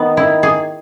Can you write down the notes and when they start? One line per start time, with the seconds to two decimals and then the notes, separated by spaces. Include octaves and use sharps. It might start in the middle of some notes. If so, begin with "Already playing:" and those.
Already playing: D#3 B3
0.17 E4
0.43 G#4